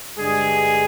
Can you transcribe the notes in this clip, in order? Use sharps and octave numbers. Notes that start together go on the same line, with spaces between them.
G2 D3 G#3 G#4